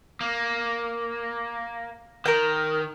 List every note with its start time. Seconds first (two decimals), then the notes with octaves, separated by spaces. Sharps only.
0.21 A#3
2.26 D#3 A#4 G5